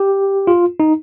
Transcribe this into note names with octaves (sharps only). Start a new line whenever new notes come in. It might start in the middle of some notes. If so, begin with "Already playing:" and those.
Already playing: G4
F4
D#4